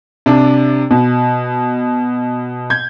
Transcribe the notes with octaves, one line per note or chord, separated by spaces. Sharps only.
C3 D4
B2
G6 G#6